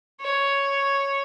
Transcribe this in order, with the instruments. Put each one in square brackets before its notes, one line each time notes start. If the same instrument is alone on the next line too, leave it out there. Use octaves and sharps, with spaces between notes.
[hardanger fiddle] C#5